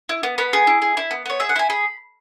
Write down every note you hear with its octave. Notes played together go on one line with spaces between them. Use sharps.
E4
B3
B3 B5
G#4
E4
G#4
E4
B3
B3 C#5
G#4 E5
F#5
E4 G#5
G#4 B5